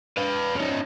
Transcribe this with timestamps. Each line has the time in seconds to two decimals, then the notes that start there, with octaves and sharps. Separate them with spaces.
0.18 B4 F5
0.56 C#4 D#4